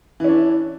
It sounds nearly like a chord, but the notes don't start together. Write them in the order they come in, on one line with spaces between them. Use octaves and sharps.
E3 C#4 D4 E4